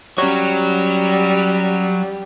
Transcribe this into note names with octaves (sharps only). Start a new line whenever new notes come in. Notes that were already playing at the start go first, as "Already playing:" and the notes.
F#3 G3 C#4 C#5